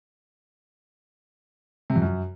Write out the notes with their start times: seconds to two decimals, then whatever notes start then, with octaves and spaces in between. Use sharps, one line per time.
1.90 C3
1.96 F2
2.02 F#2